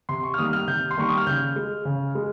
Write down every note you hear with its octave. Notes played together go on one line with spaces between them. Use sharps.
C3 C6
C#6
F6
D#3 G3 A#3 D#6
F6
C3 G6
C6
D#3 G3 A#3 C#6
D#6
F6
C#3 G6
G#3
C#3
G#3